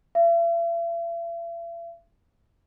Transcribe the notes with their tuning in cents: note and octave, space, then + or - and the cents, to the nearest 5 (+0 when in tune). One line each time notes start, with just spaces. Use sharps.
E5 +45